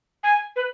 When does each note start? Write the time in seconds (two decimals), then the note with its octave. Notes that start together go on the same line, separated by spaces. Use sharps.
0.23 G#5
0.56 B4